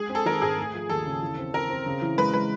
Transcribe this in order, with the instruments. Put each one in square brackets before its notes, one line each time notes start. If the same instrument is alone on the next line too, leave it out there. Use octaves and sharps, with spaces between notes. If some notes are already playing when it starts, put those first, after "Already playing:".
Already playing: [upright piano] G#3 [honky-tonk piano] G#4
[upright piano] C4
[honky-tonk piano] A4
[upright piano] D#3 [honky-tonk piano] A#4
[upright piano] G#2 [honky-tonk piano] G#4
[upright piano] A3
F3
[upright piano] D#2 [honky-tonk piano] A4
[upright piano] C#3
E3
C4
[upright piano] C4 [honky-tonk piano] A#4
[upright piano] C4
C#3
E3
[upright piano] G#3 [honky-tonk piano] B4
[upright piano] G#3 [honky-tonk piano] B4